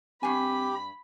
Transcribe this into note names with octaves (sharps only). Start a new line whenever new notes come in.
G2 C4 G4 G#5 B5